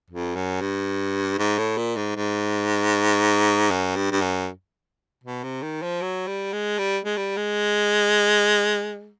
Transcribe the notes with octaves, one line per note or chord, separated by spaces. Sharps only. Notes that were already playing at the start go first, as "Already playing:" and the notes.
F2
F#2
G2
G#2
A2
A#2
G#2
G#2
F#2
G2
G2
F#2
B2
C3
D#3
F3
F#3
G3
G#3
G3
G#3
G3
G#3